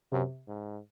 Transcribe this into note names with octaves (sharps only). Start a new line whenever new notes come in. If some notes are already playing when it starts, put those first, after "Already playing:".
F#2 C3
G#2